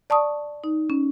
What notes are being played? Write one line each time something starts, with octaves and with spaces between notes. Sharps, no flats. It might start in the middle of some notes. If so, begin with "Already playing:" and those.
D5 A5 C#6 D#6
D#4
C#4